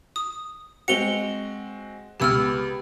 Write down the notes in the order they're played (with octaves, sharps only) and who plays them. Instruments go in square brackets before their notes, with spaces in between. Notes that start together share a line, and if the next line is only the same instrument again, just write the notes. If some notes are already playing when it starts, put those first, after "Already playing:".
[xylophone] D#6
[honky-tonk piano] G#3 C4 F#4 [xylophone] C#7 F7 G7
[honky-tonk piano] C#2 B3 [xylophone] G4 E6 F6